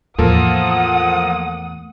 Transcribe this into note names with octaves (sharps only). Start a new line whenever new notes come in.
E2 A2 F3 A#3 A4 F#5 D#6